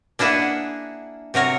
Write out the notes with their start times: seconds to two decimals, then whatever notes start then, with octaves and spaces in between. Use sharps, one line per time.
0.19 A#3 D4 E4 G#4 F#5
1.34 C3 F#3 A#4 C#5